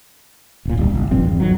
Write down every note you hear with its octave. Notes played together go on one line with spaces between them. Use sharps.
D1 A#2
D1 B1 G3
F#1
D#1 G2 F3 C4
E2
G#1 F2 D#3 F#3